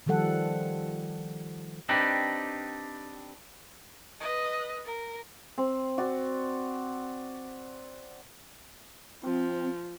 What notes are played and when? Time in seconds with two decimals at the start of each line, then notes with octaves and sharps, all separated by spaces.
0.06 D#3 F3 G3 A4 F#5
1.89 C4 D4 D#4 G4 B4
4.20 B4 D#5
4.85 A#4
5.58 C4
5.98 F#4 D5
9.24 F3 C4